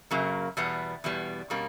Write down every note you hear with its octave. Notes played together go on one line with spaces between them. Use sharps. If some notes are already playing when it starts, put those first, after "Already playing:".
F#2 C#3 F#3 A#3
E2 B2 G3 B3
E2 B2 G3 B3
B2 G3 A#3 C#4